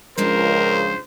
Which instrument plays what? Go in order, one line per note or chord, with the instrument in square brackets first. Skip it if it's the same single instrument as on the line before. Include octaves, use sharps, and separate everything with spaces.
[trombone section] C#2 [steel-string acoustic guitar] F3 G#3 D4 [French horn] A#4 [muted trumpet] C5